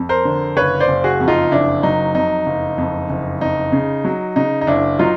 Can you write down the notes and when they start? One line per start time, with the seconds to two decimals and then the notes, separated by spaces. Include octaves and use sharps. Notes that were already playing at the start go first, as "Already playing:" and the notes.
Already playing: F2
0.09 A#4 C5
0.25 D3
0.57 F#1 B4 C#5
0.80 C5 D5
0.88 F#1
1.04 F#4 G#4
1.20 F2
1.28 D#4 F4
1.51 F#1 D4 E4
1.83 F#3 D#4
2.15 F2 D#4
2.46 F#1
2.78 F2
3.10 F#1
3.41 F2 D#4
3.72 C#3
4.04 F#3
4.36 C#3 D#4
4.61 D#4
4.67 F#1 D4 E4
4.99 F#3 D#4 F4